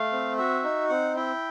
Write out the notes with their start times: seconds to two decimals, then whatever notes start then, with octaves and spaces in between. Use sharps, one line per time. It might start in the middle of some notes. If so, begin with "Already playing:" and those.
Already playing: A3 F5
0.12 C4
0.37 F#4 E5
0.64 D#4
0.89 C4 F#5
1.15 E4 G5